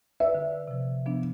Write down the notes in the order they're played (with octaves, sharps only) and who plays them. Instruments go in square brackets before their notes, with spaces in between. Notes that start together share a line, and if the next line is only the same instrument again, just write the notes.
[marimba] B4 D5 E6 [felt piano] E5
[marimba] D3
C3 F3
F3 B3 D4